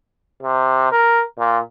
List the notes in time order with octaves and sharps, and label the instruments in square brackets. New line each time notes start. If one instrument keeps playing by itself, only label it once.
[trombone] C3
A#4
A#2